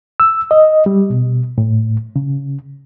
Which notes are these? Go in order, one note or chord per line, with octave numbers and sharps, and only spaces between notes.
E6
D#5
G3
B2
A2
C#3